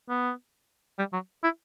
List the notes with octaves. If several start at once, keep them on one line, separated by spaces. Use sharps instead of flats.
B3
G3
F#3
E4